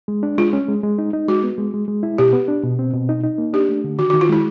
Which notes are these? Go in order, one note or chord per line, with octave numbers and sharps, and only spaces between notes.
G#3
D4
G#3 F4
C#4
G#3
G#3
D#4
D#4
G#3 F#4
B3
G#3
G#3
G#3
E4
B2 G4
B3
D4
B2
C4
B2
D#4
D#4
A#3
D4 G4
A3
D3
D#3 F#4
F#4
D#3
F4
G#3 E4